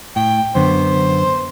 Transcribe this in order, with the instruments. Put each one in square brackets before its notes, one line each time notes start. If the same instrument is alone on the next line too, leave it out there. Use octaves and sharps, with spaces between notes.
[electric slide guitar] A2 [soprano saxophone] G5
[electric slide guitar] F#2 D3 B3 [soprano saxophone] C5